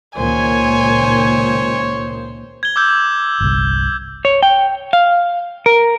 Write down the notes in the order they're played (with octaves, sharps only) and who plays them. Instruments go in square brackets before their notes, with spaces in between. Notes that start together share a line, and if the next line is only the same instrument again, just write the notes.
[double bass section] C#2 A#2 D#3 [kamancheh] C5 [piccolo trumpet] C#5 [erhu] G#5
[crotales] G#6 G7
D6 E6 G6
[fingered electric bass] G1 C2
[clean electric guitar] C#5
G5
F5
A#4